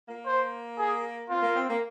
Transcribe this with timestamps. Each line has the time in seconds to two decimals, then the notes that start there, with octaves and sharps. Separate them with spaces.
0.09 A#3
0.26 C5
0.79 G#4
1.30 C4 F4
1.43 A#3
1.56 C4
1.69 A#3